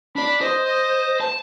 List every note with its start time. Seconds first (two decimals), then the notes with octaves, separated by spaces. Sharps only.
0.16 D4 D5 B5
0.41 C5 D#5
0.64 D#5
1.21 A5